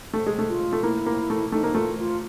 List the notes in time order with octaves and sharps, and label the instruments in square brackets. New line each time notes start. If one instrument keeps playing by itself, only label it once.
[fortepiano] A3
G#3
A3
[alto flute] F4
[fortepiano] A3
[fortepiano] A#3 [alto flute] E4
[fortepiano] A#3
A3
[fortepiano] A3 [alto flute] D#4
[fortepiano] A#3
[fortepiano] A3 [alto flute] F4
[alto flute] F4